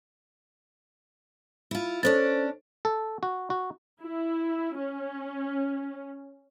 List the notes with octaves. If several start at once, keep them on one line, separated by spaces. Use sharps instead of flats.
E4 F4
B3 C#4 D4 A4 C5 A6
A4
F#4
F#4
E4
C#4